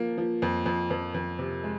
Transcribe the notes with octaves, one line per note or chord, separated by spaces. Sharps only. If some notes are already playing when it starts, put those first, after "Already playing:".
Already playing: F3 A#3
F3
F2
F2
F2
F2
C3
G#3